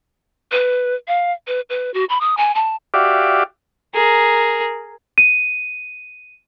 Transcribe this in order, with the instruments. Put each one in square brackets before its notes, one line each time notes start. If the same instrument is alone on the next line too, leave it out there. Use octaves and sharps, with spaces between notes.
[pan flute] B4
F5
B4
B4
F#4
B5
D#6
G#5
A5
[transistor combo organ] F#4 G4 D5 E5 F5 D6
[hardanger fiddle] G#4 A#4
[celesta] D#7